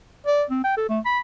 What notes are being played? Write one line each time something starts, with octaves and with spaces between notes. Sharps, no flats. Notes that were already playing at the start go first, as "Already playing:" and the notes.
D5
C4
G5
A4
A3
B5